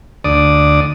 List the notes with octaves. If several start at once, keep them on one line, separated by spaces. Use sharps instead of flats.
D2 D5 D#6